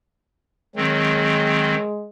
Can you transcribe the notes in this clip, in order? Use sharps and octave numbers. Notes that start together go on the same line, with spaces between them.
D#3 F#3 G#3 C4